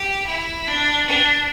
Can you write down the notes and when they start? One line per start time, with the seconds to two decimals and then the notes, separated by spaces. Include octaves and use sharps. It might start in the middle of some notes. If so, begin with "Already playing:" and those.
Already playing: G4
0.27 E4
0.67 D4
1.07 D4